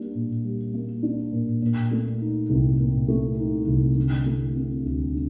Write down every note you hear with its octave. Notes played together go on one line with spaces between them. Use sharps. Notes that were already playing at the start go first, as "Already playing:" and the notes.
Already playing: G3 A#3 D4
A#2
G3
A#3
D4
A#2
A#2
A3
D#4
C2
A#2
A3
D#4
C2
D3
A3
C4
D2
D3